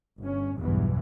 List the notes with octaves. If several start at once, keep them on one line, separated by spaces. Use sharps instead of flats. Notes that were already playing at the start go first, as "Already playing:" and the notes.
G1 C#4
B1 E2 G2 E3